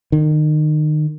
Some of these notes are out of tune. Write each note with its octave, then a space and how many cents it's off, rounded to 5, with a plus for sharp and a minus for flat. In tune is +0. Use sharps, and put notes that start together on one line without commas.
D#3 -30